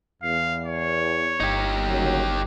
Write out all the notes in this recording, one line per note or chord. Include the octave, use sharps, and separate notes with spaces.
E2 F5
C#5
G1 D#4 G4
D#2 C#3 F#3